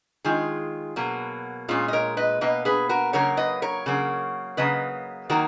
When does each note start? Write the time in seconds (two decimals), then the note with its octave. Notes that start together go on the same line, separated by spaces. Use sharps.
0.24 D#3 G#3 F4 G#4
0.96 B2 F#3 A#3
1.68 A#2 G#3 C#4 F4
1.88 D#5
1.93 A#4 C#5
2.17 B4 D#5
2.41 B2 A#3 B4 D#5
2.65 G#4 B4
2.89 F#4 A#4
3.13 C#3 F#3 A#3 A#4 C#5
3.37 B4 D#5
3.62 A#4 C#5
3.86 C#3 F#3 A#3
4.57 C#3 F#3 A#3 B4 D#5
5.30 D#3 F#3 A#3 F#4 A#4